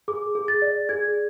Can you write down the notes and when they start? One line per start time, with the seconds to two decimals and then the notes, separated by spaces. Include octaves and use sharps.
0.08 G#4 D6
0.35 G#4
0.48 A6
0.62 D5
0.89 G#4 G#6